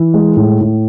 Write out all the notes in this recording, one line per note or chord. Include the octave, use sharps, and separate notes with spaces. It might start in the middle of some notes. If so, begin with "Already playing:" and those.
Already playing: E3
G#3
A2
A2